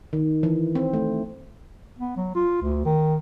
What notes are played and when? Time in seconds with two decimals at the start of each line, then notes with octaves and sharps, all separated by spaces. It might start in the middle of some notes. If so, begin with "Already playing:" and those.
0.13 D#3
0.43 E3
0.75 C4
0.93 A3
1.99 B3
2.17 F#3
2.35 F4
2.62 D2
2.85 D#3